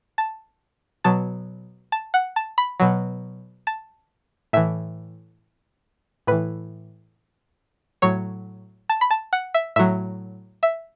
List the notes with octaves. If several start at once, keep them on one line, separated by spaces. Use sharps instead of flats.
A5
B2 F#3 A5
A5
F#5
A5
B5
B2 F#3
A5
A2 E3 E5
A2 E3 B4
A2 F#3 C#5
A5
B5
A5
F#5
E5
A2 F#3 E5
E5